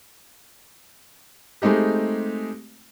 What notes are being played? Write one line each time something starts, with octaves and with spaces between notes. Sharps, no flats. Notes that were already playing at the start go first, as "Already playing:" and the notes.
G#3 A3 C4 D#4 G4